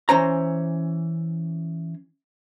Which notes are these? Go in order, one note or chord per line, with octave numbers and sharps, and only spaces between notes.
E3 C#4 C5 A#5